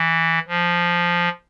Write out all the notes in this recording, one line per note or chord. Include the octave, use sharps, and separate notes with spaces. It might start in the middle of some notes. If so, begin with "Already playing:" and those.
Already playing: E3
F3